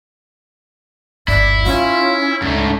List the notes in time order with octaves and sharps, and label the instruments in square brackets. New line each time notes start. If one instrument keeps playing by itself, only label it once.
[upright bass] G1 D#2 [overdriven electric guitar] E4 [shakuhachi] D5
[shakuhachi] C#4 [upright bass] D#4 [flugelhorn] F4
[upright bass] C#2 [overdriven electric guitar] G#2 A3 [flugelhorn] D4